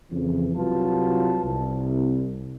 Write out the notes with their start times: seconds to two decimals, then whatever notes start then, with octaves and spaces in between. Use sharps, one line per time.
0.11 F2 C#3 E3
0.56 C2 F#3 F4 B4 A5
1.44 C2